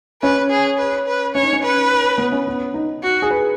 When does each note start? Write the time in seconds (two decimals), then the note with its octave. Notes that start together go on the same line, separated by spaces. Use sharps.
0.22 C#4 B4
0.50 G#4
0.78 B4
1.06 B4
1.35 C#4 C#5
1.43 D#4
1.53 C#4
1.63 B4
2.18 B3
2.32 C#4
2.47 B3
2.74 D#4
3.02 F#4
3.22 G#4
3.31 B4